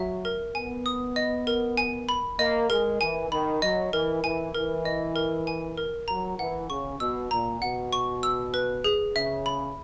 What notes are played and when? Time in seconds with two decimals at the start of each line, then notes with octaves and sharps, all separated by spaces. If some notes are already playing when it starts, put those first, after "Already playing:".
Already playing: F#3 E5
0.25 A#4
0.55 B3 G#5
0.86 D#6
1.16 D#5
1.47 A#4
1.77 G#5
2.09 B5
2.39 A#3 D#5
2.70 G#3 A#4
3.01 E3 G#5
3.31 D#3 B5
3.62 F#3 D#5
3.92 E3 A#4
4.24 E3 G#5
4.55 E3 A#4
4.85 D#5
5.16 A#4
5.47 G#5
5.77 A#4
6.08 F#3 A#5
6.38 E3 F#5
6.70 C#3 C#6
7.00 B2 E6
7.31 A#2 A#5
7.61 B2 F#5
7.93 C#6
8.23 E6
8.54 B4
8.84 G#4
9.15 C#3 E5
9.46 B5